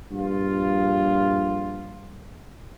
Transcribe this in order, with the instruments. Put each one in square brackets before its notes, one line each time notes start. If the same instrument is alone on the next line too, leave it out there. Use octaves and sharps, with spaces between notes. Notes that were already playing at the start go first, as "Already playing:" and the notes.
[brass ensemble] A#1 G2 F4